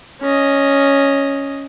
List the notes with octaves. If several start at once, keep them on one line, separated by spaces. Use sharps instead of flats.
C#4 D#5